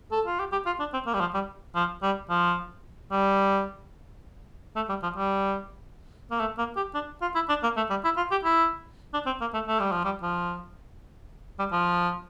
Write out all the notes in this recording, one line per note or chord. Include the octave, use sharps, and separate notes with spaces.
A4
F4
G4
G4
F4
D4
C4
A#3
G3
F3
G3
F3
G3
F3
G3
A3
G3
F3
G3
A#3
A3
A#3
G4
D4
F4
E4
D4
A#3
A3
G3
E4
F4
G4
E4
D4
C4
A#3
A3
A3
G3
F3
G3
F3
G3
F3